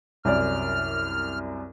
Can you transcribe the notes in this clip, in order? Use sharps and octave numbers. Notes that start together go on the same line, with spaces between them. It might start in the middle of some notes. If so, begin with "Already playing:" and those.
C2 F#2 D5 F6